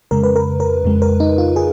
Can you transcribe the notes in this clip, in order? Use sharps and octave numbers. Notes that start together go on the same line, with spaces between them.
F2 C#3 G#3 A#4
B4
A#4
A#4
F2 C#3 G#3
A#4
D#4
F4
G#4